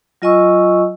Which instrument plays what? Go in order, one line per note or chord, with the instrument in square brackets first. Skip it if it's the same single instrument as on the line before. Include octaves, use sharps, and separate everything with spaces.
[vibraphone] F#3 F4 D#5 G#5 C#6 E6